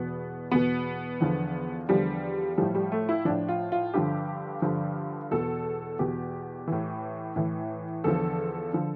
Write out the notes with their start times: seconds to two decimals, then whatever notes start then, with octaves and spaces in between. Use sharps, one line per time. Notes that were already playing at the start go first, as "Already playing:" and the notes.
Already playing: E2 B2 B3
0.51 E2 B2 B3
1.21 E2 D3 F3
1.89 E2 D3 F3 G3
2.57 A2 F3 G3
2.75 G3
2.92 A3
3.09 E4
3.25 A2 F3 D4
3.48 F4
3.72 F4
3.93 G2 D3 F3 G4
4.62 G2 D3 F3
5.31 E2 B2 A4
5.99 E2 B2 G4
6.67 A2 E3
7.36 A2 E3
8.04 E2 D3 F3 A4
8.73 D3 F3